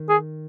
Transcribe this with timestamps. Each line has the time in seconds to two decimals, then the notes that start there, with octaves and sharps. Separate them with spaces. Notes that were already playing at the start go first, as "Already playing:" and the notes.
Already playing: D#3
0.09 G#4